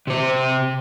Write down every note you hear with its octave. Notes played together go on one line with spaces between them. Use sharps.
C3 C5